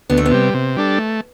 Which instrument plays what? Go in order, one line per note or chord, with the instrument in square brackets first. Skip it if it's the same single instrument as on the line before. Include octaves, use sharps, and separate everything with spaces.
[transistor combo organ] D2 [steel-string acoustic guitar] B3
[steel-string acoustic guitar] A3
B3
[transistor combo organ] C3 G3
C3
G3 D4 A4
A3